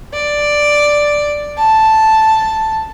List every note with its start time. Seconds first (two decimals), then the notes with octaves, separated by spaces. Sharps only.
0.14 D5
1.58 A5